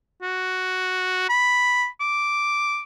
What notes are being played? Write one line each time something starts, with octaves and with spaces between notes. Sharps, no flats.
F#4
B5
D6